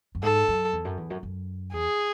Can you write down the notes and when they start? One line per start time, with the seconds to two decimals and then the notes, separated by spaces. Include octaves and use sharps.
0.15 F#2
0.23 G#2 A4
0.48 F#2
0.73 E2
0.85 F#2
0.97 E2
1.10 F#2
1.23 F#2
1.73 E2 G#4